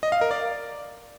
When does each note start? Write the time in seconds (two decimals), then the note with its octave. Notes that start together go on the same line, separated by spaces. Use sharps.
0.03 D#5
0.12 F5
0.21 A#4
0.31 D5